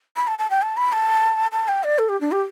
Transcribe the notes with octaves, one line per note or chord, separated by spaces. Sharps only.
B5
A5
A5
G5
A5
B5
A5
A5
G5
D5
A4
G4
D4
G4